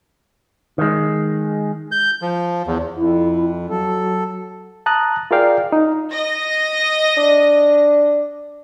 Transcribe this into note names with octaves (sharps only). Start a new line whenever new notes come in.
D#3 G#3
G6
F3
E2
F2 E4
F#3 A4
A5 A#5 D#6 F#6
F4 G#4 A#4 D5 F5 G5
D#4
D#5 A#6
D4